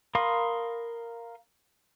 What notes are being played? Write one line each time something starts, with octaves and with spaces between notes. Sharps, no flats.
A#4 F5 B5 C6 D#6